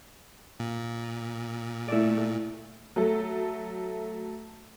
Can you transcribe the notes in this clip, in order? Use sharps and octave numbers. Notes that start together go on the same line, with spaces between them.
A#2
A3 E4 D5
F#3 A3 A4